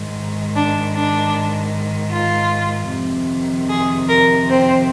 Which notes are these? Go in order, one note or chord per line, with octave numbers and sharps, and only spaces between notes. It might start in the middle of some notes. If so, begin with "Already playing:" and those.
Already playing: G#2 D#3
D4
D4
F4
F2 C3 D#3
G#4
A#4
C4